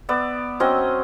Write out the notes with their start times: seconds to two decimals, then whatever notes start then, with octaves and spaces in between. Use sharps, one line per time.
0.09 B3 D5 E5
0.60 F#3 C4 C#4 D#5